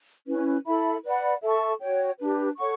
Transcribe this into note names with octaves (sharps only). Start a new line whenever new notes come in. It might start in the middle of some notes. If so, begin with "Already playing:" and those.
C#4 E4 B4
E4 A4 E5 B5
B4 D5 F#5 B5
A4 E5 A5 C#6
F#4 C#5 G5
D4 G4 B4
A4 C#5 F#5 C#6